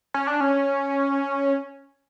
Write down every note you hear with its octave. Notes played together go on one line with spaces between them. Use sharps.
C#4
D4
C#4